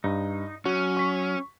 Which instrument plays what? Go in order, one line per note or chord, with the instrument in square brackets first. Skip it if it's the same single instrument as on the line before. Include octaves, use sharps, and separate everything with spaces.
[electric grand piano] G2 [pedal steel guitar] D#4
[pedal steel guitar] F#3 [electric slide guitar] C#4 [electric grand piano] F#4
[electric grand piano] C#6 B6